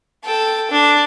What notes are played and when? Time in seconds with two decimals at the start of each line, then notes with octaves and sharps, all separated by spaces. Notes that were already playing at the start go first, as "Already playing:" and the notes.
0.25 A4 G5
0.71 D4